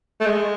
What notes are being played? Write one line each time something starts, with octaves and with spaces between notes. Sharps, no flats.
A3
G#3